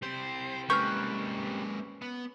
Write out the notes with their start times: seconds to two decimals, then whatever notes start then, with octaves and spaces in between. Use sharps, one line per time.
0.03 G3 C4 C5
0.70 G#3 A#3 C#4 B4 C#6 F6 G6
2.02 B3